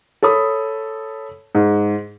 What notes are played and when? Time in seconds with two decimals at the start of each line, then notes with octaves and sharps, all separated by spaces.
0.23 A4 C#5 B5 D#6
1.55 G#2